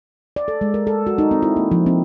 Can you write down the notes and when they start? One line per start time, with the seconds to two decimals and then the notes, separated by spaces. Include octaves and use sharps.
0.36 D5
0.48 A4
0.61 G#3
0.74 A#4
0.87 A4
1.07 F#4
1.18 D#4
1.31 C4
1.43 E4
1.56 A#3
1.71 F3
1.86 C4